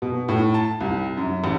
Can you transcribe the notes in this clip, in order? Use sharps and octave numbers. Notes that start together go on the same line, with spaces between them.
B2
A2
A5
C2
F#2
A1